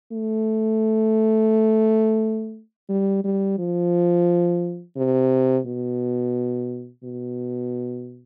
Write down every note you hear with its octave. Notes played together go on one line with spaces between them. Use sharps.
A3
G3
G3
F3
C3
B2
B2